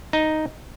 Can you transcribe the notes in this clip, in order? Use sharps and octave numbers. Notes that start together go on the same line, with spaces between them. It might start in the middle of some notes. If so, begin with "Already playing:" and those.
D#4